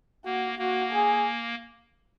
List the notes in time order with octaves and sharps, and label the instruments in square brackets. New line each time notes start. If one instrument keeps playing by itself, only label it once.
[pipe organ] A#3 [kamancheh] F#4
[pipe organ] A#3 [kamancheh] F#4
[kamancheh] G#4